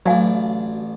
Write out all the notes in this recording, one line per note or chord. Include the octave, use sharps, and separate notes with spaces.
A1 F#3 D4 D5 F5 G#5